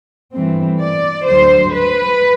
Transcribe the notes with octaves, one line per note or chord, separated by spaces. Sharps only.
G2 E3 A3 C4
D5
D2 D3 F#3 C5
B4